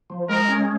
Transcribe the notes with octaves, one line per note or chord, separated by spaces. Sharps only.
F3
G#3 A#4
C#4